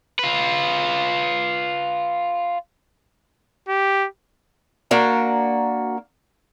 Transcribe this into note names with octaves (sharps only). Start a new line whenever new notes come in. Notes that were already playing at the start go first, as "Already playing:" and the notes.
F4 B4
G4
A#3 D4 F#4 A#5